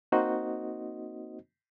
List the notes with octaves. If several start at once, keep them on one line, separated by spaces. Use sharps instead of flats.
A#3 C4 D#4 F#4 C5 D#5